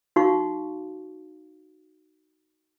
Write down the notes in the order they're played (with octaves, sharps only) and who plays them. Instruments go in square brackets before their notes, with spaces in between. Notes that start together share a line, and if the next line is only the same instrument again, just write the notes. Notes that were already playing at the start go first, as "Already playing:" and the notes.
[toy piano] D#4 F#4 F5 C#6